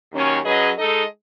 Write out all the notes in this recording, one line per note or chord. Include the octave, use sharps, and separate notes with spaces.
D#2 D#3 F#3 C#4
F#3 C#4 G#4 B4 D#5
G#3 D#4 A4 D#5